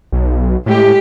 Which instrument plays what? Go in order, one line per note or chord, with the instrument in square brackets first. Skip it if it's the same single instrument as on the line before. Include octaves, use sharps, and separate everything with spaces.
[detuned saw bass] B1
[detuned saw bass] A2 [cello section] G#3 G4